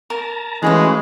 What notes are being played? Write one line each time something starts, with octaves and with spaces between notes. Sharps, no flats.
A#4 A5 A#5
E3 G#3 A3 C#4 F#4 G#4 B4 F5